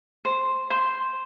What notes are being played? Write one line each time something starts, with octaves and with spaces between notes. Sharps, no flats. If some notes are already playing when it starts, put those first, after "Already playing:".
C5
C5 C6